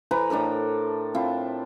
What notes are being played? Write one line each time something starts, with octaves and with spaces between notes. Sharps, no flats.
E3 B4 C5 A#5
A2 D4 A4 A#4
C4 E4 F4